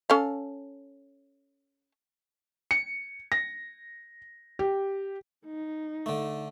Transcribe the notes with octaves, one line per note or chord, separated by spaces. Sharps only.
C#4 A4 F5
C#7
A#6
G4
D#4
D3 A3